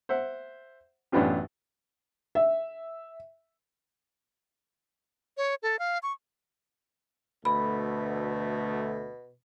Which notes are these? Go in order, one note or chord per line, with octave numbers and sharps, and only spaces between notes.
C5 E5 F#5
A1 F#2 B3 D4 F4 G4
E5
C#5
A4
F5
C#6
D2 B2 A3 B5